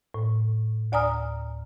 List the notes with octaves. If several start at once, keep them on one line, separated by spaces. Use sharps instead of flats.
A2
D2 D5 G#5 A#5 D#6 F6